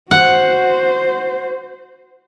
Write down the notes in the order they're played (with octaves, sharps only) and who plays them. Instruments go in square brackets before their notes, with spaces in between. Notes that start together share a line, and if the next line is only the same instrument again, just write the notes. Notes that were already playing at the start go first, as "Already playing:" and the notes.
[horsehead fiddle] F#4 C5 [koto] F#5